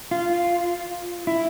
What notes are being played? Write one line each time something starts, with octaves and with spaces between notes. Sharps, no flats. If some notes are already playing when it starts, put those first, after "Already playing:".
F4
E4